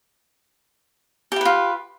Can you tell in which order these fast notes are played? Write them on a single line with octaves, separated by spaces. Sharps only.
G4 E4 B4 F4